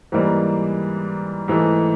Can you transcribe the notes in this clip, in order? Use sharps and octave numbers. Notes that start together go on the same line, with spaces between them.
G#2 E3 G3 A#3
G#2 E3 A3